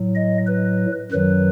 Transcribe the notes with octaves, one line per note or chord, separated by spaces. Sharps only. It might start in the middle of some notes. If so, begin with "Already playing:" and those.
Already playing: A2 F#3
D#5
B4
F#2 D#3 F#3 B4